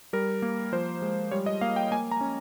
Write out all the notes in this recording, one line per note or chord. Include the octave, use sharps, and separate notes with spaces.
G3 A#4
A#3
F3 C5
G#3
G3 C#5
D#5
A#3 F5
G5
A#3 G#5
A#5
C#4